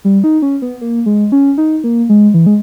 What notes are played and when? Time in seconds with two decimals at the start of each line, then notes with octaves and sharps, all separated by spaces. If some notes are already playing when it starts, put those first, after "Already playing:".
0.05 G3
0.24 D#4
0.42 C#4
0.62 B3
0.81 A#3
1.06 G#3
1.32 C#4
1.58 D#4
1.84 A#3
2.09 G#3
2.34 E3
2.46 G#3